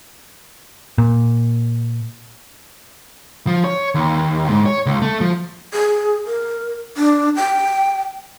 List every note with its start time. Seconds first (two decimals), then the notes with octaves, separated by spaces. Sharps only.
0.98 A#2
3.47 F3
3.64 C#5
3.95 D#2
4.50 G#2
4.66 C#5
4.86 C#2
5.02 A3
5.21 F3
5.74 G#4
6.26 A#4
6.97 D4
7.36 G5